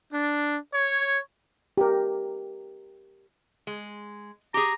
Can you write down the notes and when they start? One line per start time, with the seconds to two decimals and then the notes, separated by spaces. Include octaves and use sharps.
0.14 D4
0.74 C#5
1.77 G4 A#4
3.67 G#3
4.54 G4 G#4 A#5